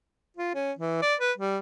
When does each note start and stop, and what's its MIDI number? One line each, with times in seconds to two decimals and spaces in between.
0.37 0.51 65
0.55 0.72 61
0.79 0.98 52
1.02 1.15 74
1.20 1.32 71
1.38 1.58 55